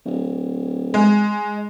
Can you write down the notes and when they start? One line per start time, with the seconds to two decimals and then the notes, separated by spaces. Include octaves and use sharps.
0.06 D1
0.94 G#3